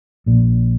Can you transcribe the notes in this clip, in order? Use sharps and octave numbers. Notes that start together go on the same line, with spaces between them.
A#1 A#2